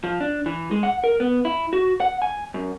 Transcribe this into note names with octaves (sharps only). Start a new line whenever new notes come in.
F3
D4
E3
G#3
F#5
A#4
B3
E4
F#4
F#5
G#5
F#2